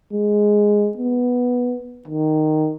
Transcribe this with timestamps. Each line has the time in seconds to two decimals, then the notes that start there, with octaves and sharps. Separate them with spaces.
0.13 G#3
0.97 B3
2.08 D#3